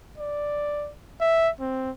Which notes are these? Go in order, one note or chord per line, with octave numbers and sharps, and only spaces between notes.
D5
E5
C4